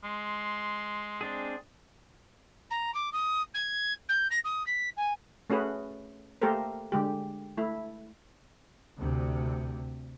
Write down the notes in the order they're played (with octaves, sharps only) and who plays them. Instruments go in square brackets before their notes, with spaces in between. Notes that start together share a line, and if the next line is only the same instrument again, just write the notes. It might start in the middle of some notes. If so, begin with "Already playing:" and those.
[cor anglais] G#3 [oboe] C6
[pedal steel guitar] C4 D4 G#4
[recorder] A#5
D6
D#6
G#6
G6
A#6
D#6
B6
G#5
[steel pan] A3 C#4 F#4 G#4 B4
A3 A#3 G4 A4 A#4 C5
D3 G#3 G4
A3 E4
[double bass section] D2 C3